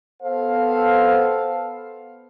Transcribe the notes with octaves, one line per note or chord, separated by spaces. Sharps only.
B3 A4 C5 F5